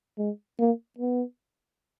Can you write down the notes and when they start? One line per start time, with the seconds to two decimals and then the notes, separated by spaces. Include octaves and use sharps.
0.18 G#3
0.59 A#3
0.98 B3